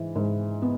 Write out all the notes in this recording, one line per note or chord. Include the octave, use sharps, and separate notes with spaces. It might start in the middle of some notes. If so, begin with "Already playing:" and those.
Already playing: G#2 E3
G#2
B3